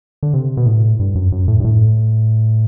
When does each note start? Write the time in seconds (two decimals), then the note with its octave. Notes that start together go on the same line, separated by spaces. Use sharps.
0.23 D3
0.33 C3
0.57 B2
0.66 A2
0.99 G2
1.15 F#2
1.32 F#2
1.48 A2
1.60 G2
1.64 A2